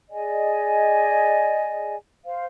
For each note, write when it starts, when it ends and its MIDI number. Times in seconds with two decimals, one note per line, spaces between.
0.10 1.95 68
0.10 1.95 74
0.10 1.95 75
0.10 1.95 80
2.25 2.45 72
2.25 2.45 77